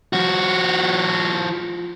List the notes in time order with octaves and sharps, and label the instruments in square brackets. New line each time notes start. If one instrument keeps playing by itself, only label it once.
[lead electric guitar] F3 F#4